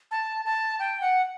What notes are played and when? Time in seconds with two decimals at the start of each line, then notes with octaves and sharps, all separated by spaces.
0.11 A5
0.45 A5
0.79 G5
1.01 F#5